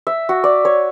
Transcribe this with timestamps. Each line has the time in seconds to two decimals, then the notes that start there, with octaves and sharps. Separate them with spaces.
0.07 E5
0.29 F#4
0.44 D5
0.65 C#5